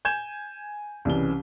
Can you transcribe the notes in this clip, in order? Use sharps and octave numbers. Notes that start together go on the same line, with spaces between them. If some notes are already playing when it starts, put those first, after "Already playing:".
G#5 G6 G#6 E7
C2 C#3 E3 G7